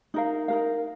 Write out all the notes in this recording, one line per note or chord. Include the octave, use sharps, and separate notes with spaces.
D#4 A#4 F5
D#4 A#4 F5